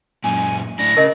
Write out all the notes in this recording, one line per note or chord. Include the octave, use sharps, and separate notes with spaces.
F#2 A#2 G#5
A2 D4 A#6
C#3 A#4 D#5